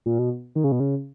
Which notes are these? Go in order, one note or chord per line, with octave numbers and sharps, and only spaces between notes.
A#2
B2
D#3
C#3
B2
C#3